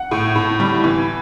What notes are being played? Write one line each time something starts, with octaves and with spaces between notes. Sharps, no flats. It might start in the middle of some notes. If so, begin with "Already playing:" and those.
Already playing: F#5
A2
A2
G3
E3